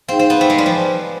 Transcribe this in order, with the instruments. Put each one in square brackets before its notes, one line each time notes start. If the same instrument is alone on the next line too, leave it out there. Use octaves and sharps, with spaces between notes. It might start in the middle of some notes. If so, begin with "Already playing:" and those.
[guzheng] C4 [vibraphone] D#4 G#4 C5 F5
[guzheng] C4
B3
A3
G#3
G3
F3